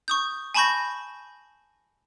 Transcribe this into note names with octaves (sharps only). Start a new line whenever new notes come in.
C#6 D#6 G6
G#5 A5 B5 C#6 G6 A#6